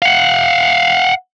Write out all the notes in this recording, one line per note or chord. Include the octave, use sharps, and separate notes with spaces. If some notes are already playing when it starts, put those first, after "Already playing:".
F5 F#5